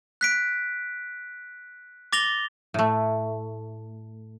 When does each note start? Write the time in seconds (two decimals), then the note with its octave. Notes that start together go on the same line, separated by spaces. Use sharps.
0.21 F#6 B6 D7
2.13 D6 A6 A#6 F7 G7
2.74 A2 A3